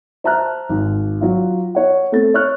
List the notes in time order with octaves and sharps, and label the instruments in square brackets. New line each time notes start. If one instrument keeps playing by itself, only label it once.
[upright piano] C5 E5 A5 A#5 F6 F#6
G#1
F#3 F4
C#5 F#5
A3 C4 A6
C#5 C#6 F6 F#6